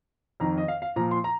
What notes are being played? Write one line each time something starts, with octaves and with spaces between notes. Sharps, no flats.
F2 D#3 A#5
D#5
F5
F5
A#2 F3 A#5
C6
A#5